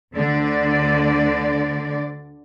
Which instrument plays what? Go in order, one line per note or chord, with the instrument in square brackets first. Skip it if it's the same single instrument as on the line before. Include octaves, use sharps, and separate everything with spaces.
[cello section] D2 D3 D5